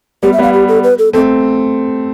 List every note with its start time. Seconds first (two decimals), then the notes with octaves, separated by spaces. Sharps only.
0.23 G3 B3 G4
0.33 E5
0.38 G3 B3 F5
0.53 G4
0.68 A4
0.84 B4
0.99 A4
1.13 A3 C4 A4